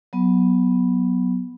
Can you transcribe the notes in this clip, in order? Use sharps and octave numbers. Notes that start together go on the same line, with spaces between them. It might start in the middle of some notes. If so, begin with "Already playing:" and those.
F#3 B3